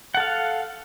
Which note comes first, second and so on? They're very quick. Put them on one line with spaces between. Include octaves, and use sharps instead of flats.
F#5 A4 F5